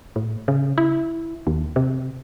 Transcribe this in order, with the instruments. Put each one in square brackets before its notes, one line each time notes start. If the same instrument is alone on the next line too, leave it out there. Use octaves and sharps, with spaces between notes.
[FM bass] A2
C#3
E4
D#2
C3